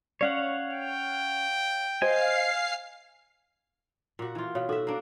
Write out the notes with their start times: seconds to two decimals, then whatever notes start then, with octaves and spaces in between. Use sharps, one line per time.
0.21 C#4 C#5 D5 F5 F#5
0.73 G5
2.02 C5 D#5 F5 G#5 C7
4.19 A#2 F#4
4.35 E3 F4
4.55 B2 C#5 F5
4.69 D#4 F#4 A4 E5
4.87 A#3 D4